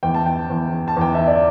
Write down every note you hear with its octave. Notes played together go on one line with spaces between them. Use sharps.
E2 G5
A5
G5
E2
A5
E2 G5
E5
D5